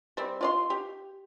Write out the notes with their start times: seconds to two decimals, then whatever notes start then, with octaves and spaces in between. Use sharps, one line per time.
0.17 G3 C4
0.41 F4 D5 C6
0.70 G4